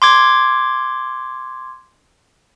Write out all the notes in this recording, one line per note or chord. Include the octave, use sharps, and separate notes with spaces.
C6 D6 G#6